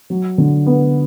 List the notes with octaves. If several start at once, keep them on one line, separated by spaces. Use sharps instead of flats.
F#3
D3
B3